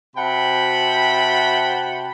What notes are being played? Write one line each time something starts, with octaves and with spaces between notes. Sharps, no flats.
C3 F#4 F#5 G5 A5 B5